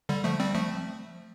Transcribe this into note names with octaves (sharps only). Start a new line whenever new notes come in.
D3 G3
F3 A3
G3 C4
F3 A3